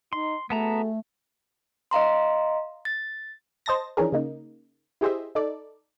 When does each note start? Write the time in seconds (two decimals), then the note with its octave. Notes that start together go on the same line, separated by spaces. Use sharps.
0.13 D#4 C6
0.50 A3 B3 F#4 G#4 A4 A5 A#5
1.91 D#5 F5 A#5 C6
2.85 A6
3.66 C5 D#5 A5 A6 A#6
3.97 E3 F3 C#4 D4 G#4 A#4
4.12 C#3 A#3 D#4
5.01 E4 G4 G#4 C5 D#5 E5
5.35 D#4 A4 D5